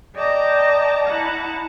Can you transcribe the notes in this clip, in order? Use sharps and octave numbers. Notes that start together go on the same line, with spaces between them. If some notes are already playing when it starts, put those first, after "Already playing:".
D5 D#5 G5 A5 A#5
E4 F#5 A5 A#5